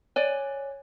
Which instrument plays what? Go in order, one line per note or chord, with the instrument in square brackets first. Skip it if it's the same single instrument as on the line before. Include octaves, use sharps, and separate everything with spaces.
[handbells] C#5 [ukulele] D5 G#5